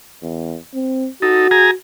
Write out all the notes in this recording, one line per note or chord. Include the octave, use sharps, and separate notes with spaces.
E2
C4
D#4 F#4 A4
G#4 G#5 A#5